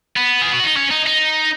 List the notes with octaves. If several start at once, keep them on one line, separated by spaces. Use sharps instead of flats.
B3
G#4
F#4
D#4
C#4
D#4
D#4